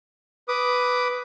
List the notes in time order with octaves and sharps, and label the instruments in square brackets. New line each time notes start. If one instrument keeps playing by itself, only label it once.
[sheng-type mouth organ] B4 D6 D#6